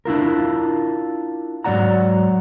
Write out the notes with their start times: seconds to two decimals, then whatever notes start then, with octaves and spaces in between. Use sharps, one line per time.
0.05 D4 E4 F4 A#4
1.64 G#2 F#3 G3 D5 F#5 A#5